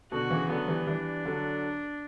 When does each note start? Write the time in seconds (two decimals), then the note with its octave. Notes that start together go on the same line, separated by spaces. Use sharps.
0.12 B2 D3 F#4
0.30 C#3 E3
0.49 D3 F#3 B3
0.68 E3 G3
0.87 E3 G3 D4
1.25 D3 F#3